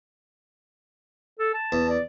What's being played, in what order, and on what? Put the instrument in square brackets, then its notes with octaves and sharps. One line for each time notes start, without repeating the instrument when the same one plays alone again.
[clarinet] A4
A5
[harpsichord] E2
[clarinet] D5